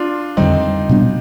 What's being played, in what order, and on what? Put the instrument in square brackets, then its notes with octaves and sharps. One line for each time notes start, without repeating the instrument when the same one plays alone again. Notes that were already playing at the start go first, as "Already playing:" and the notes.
Already playing: [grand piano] D4 F4
[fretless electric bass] F2 D3 G3 [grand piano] C4 D#4
[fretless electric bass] B2 G3 B3 D4